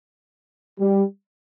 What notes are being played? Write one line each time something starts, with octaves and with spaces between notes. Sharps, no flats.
G3